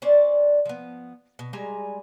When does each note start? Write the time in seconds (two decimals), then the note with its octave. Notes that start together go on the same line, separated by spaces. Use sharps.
0.02 C#4 D4 C5 D5
0.66 F3 B3
1.39 B2
1.53 G3 G#3 G#5 A#5